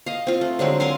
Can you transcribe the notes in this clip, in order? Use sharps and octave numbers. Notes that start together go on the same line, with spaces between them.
D#5 F5
C4 F4
A3
D3 F#3 G#3 C4
A#4 F5 G#5 C6